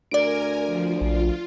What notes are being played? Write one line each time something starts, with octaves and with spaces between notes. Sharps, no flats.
D2 A#4 D5 G#5 D7
F3
A#1 F4